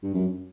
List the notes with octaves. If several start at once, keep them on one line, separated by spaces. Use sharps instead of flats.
G2
F#2